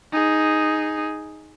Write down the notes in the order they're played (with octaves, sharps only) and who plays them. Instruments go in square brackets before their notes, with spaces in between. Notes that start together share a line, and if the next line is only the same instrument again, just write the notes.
[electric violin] D#4 G#4